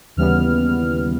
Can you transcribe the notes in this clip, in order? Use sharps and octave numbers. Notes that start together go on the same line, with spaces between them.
D#2 C#3 E3 G3 B3 F6